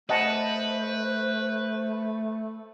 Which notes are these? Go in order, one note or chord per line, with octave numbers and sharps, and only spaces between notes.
A3 B4 C5 D#5 F#5 A5